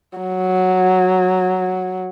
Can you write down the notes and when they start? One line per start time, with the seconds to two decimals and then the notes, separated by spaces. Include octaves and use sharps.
0.18 F#3